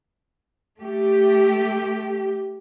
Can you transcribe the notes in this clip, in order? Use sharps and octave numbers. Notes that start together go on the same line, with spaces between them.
A3 G4